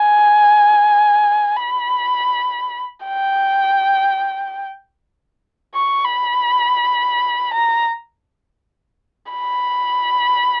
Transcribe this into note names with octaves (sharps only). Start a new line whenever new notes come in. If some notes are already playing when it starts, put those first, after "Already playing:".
Already playing: G#5
B5
G5
C#6
B5
A#5
B5